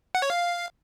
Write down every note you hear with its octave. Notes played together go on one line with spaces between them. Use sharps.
F#5
C#5
F5